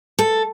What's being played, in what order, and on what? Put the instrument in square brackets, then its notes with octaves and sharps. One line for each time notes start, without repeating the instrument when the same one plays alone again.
[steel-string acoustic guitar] A4